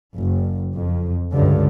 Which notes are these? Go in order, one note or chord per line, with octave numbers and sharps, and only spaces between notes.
F#1
F2
C#2 G2 D3